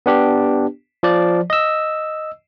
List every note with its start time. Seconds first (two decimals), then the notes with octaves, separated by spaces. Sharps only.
0.06 B3 D4 G4
1.03 F3 D5
1.50 D#5 E6